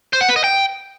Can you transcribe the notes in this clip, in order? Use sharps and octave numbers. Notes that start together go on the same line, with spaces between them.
C5
F#5
B4
D#5
G5